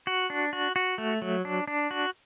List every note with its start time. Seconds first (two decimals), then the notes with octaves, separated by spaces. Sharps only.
0.07 F#4
0.30 D4
0.53 F#4
0.76 F#4
0.98 A3
1.22 F#3
1.45 D4
1.68 D4
1.91 F#4